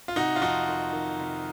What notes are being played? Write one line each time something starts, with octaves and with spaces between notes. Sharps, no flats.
F4
C3 D#4 F#4
F4
F2 D#4 F#4
D#3
D#3
C3